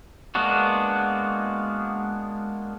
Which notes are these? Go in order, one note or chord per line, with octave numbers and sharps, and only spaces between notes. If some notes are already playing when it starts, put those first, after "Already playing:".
G#3 A#3 B3 D4 F#4